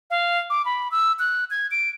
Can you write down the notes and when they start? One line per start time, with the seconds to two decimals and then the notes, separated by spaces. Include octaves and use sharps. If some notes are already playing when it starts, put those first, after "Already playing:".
0.10 F5
0.50 D6
0.65 B5
0.91 E6
1.19 F#6
1.51 G#6
1.71 D7